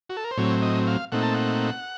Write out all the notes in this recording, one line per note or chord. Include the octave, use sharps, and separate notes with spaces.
F#4
A4
A#4
C5
A2 F#3 C4 C#5
D#5
F5
A#2 A3 C4 D#4 F#5
A5
F#5